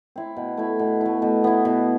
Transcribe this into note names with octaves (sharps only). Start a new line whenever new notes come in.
C4 E4
B2
A3 E4
B2
A3 E4
B2
B3 E4
B2